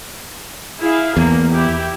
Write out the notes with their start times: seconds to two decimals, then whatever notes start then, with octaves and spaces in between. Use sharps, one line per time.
0.80 E4 G#4 F5
1.17 E2 A#3
1.51 E4 G4